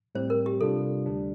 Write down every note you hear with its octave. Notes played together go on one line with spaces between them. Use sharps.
A2 G3 C4 G4 C5
A#4
G4
C3 G3 D4 F4 A4
D2 D3 G3 D4